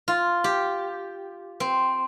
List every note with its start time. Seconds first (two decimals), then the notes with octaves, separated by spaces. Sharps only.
0.08 F4
0.44 G4
1.60 C4